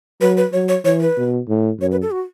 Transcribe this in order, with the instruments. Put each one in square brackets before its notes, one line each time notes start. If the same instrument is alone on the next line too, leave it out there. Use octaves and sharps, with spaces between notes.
[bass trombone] F#3 [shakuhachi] B4
[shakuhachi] B4
[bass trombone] F#3 [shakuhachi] C#5
[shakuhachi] C#5
[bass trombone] E3 [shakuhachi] C#5
[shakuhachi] B4
[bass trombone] B2
A2
[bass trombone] F#2 [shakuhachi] C#5
[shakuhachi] B4
A4
F#4